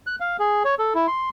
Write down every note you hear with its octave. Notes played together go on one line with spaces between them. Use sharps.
F#6
F5
G#4
C#5
A4
E4
C6